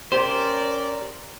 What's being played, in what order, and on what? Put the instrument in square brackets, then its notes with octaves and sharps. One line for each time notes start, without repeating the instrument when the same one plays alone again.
[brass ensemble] C#4 A#4 D5 [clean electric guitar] G4 C5